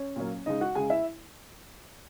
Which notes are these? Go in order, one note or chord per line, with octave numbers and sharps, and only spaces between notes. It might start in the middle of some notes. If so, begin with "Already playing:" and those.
Already playing: C#4 C#5
A#2 F#3 A#3
C#3 G#3 D#4 D#5
F#4 F#5
C#3 G#3 G#4 G#5
E4 E5